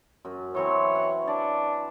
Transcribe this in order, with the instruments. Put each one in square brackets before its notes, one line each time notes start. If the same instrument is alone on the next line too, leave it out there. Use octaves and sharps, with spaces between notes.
[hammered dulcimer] F#2
[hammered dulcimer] E3 F#3 C4 [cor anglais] C#5
[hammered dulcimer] F#5
[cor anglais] D4 [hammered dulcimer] D5